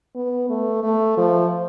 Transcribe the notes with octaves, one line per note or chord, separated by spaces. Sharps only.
B3
A3
A3
F3